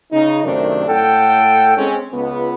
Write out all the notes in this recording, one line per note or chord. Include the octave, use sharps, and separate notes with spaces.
C#3 D#4
F#2 C3 D#3 A3 C4 D4
A2 A4 F#5 G5
G#3 C4 C#4
C#2 B3